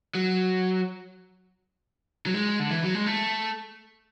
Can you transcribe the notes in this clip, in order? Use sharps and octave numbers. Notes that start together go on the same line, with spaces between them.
F#3
F#3
G#3
D3
E3
F#3
G#3
A3